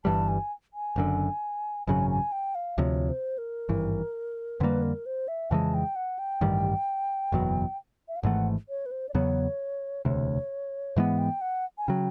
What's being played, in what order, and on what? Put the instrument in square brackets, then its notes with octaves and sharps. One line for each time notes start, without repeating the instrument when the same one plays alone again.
[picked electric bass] G1 G2 E3 G3 [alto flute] A5
[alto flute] G#5
G#5
[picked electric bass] F#1 F#2 D3
[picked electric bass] G#1 F#2 C#3 F#3 [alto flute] G#5
[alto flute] G#5
G5
F5
[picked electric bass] D2 C3 F3 [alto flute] C#5
[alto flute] C5
A#4
[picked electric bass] G#1 G2 E3
[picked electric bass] F2 D3 G3 A#3 [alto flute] B4
[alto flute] A#4
C5
E5
[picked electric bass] F2 C#3 E3 G#3 [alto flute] A5
[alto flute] G5
F#5
G5
[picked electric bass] A1 G2 D#3 G3
F#1 E2 B2 F#3
[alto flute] E5
F5
[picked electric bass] G#1 G#2 E3 A3 [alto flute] F#5
[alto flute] C#5
B4
C5
D5
[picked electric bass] E2 C#3 F#3 B3 [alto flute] C#5
[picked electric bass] E1 D2 C3 [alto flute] C#5
[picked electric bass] G#2 E3 G#3 B3 [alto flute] F#5
[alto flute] G5
F#5
G#5
[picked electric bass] C#3 F#3 [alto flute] G5